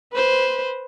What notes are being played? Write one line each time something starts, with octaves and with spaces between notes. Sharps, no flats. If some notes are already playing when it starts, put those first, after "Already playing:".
B4 C5